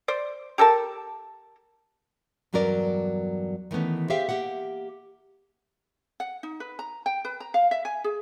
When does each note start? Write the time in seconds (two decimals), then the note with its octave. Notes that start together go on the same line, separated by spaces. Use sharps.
0.08 C5 D5
0.58 G4 A4 A#4 A5
2.53 E2 G2 F#3 C#4 A#4 D5
3.71 D#3 E3 A3 B3 C#4
4.10 G4 G#4 C5 E5 F5 G5
4.29 A#3 G4 E5 F#5
6.20 F#5
6.43 D#4
6.60 B4
6.79 A#5
7.06 G5
7.25 B4
7.40 A#5
7.54 F5
7.71 E5
7.85 G#5
8.04 G#4